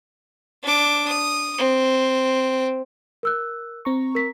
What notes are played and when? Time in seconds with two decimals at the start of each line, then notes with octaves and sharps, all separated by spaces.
0.63 D4 D6
1.08 D#6
1.58 C4
3.23 A#4 E6 F#6
3.85 C4 A#5 C#6
4.15 A#4 B6